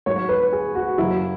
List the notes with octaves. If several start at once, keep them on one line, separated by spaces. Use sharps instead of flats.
G#2 F#3 C#5
B4
G#4
F#4
F#2 C#3 F#3 E4